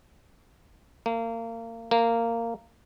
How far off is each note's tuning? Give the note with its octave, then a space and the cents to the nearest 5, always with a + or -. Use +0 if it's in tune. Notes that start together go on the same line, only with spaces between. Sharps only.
A#3 -30
A#3 -15